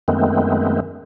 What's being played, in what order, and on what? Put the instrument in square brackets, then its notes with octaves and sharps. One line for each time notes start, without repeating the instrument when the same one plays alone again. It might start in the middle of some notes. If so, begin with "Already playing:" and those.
[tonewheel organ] F#2 D#3 G#3 A3 B3 C4